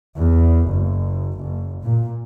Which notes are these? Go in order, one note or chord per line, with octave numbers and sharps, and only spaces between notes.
E2
F#1
F#1
A#2